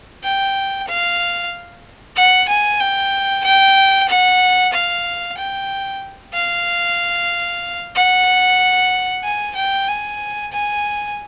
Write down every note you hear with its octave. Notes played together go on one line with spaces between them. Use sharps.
G5
F5
F#5
G#5
G5
G5
F#5
F5
G5
F5
F#5
G#5
G5
G#5
G#5